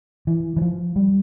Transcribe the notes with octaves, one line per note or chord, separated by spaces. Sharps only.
E3
E3
F3
G3